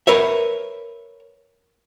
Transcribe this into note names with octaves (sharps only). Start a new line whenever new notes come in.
A#4 B4 C#5 E5